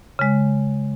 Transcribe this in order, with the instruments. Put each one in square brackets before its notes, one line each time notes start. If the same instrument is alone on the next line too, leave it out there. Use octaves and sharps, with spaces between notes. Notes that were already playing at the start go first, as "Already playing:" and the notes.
[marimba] C#3 G#3